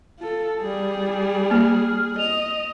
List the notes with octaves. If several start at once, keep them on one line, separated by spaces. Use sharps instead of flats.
F4 A4
G3 G#4
A#3 F6
D#5 F7